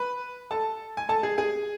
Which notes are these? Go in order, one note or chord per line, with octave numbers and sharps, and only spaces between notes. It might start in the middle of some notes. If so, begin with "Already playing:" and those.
Already playing: B4 B5
A4 A5
G#5
A4 A5
G#4 G#5
G#4 G#5